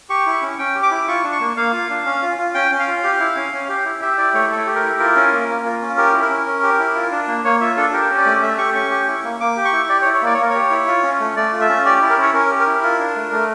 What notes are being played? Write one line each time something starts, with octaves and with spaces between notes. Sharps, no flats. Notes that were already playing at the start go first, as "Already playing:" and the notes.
G4 C#6
E4
C#4
C#4 G5
G4
D6
E4
F4 C#6
D4
C#6
A#3
A#3 F5
F4
D4
C#4
F4
F4
C#4 G5
C#4
F5
F4
G4
E4
C#4
C#4
G4
E4
G4 E5
E4 D5
A3 C#5
A3 A4
G4
A#4
E4
F4 A#4
C#4
A#3
A#3
F4
C#4
G4 A#4
E4
A#4
C#4
C#4
G4
E4
F4
D4
A#3
A#3 C#5
F4 E5
D4 A4
G4 A#4
C#4
D5
A3
A3 E5
G4 C#6
C#4 C#6
G4
E4
A#3
A#3 D6
G4
C#6
E4
G4 D5
C#5
E4
C#5
A#3 D5
C#5
A#3 A#4
C#5
G4
E4
F4
C#4
A3
A3 D5
F4
E5
C#4
G4 D5
E4
A#4
C#4 C#5
C#4 A#4
G4
A#4
E4
F4
D4
A3
A3